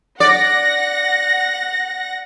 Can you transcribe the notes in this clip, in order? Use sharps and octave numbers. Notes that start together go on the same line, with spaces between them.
D5 F#5 A#6